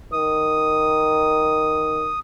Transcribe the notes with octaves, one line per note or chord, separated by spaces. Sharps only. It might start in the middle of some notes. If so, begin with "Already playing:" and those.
D#3 D#6